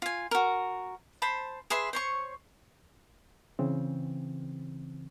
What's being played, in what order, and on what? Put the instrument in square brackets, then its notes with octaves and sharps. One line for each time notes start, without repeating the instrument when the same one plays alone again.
[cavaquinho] F4 G#5
F#4 A#4
C5 A5 B5
G#4 B4 E5 C6
C5 C#5 C#6
[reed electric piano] C#3 E3 C4